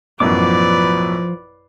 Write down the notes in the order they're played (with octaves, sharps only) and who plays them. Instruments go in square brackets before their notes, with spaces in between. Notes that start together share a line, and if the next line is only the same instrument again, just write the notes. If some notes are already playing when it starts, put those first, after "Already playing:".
[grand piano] A1 F#2 B2 [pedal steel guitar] F3 D6 [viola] B4 D5